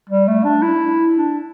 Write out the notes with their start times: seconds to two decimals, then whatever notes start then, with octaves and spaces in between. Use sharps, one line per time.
0.10 G3
0.28 A3
0.44 D4
0.62 E4
1.15 D4